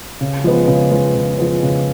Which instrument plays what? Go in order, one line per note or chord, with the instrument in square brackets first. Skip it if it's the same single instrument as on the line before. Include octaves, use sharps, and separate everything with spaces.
[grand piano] C#3
F3 G#3 B3
C#3
F3 G#3 B3
C#3
F3 G#3 B3
C#3